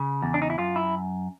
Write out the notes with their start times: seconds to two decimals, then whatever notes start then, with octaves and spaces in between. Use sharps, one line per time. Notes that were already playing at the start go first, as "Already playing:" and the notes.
Already playing: C#3
0.22 E2
0.34 D4
0.42 D#4
0.50 E4
0.58 F#2 F4
0.76 E4